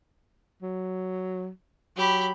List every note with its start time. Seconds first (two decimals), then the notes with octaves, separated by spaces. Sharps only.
0.62 F#3
1.97 F#3 G4 B5